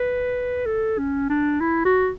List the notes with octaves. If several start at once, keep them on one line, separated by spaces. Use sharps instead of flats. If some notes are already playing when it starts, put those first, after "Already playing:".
Already playing: B4
A4
C#4
D4
E4
F#4